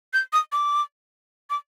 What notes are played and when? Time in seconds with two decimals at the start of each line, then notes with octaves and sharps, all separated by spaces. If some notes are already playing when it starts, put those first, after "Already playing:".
0.13 G6
0.33 D#6
0.52 D6
1.50 D6